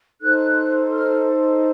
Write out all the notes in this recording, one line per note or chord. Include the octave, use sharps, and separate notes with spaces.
D#4 A4 C5 F#6
F6